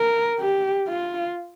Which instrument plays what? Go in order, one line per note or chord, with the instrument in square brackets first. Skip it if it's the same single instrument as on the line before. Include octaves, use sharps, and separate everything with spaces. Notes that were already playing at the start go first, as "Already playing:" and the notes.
Already playing: [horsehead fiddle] A#4
G4
F4